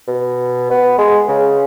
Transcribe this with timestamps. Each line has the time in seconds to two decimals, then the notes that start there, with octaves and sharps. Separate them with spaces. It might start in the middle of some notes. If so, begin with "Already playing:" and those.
0.07 B2
0.70 B3
0.98 G#3
1.28 C#3